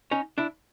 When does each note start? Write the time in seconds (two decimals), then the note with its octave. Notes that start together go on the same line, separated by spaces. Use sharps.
0.11 C#4 D#4
0.38 D4 E4